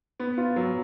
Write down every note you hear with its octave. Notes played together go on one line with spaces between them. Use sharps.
B3
F4
F#3